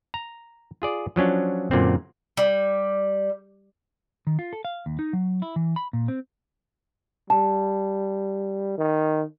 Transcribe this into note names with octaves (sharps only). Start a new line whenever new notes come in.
A#5
F4 G#4 D5
F3 F#3 C#4 D4
F#2 A#2 D3 C4
G3
D#3
F4
A4
F5
D#2
D#4
F#3
E4
E3
B5
A#2
C4
G3 A5
D#3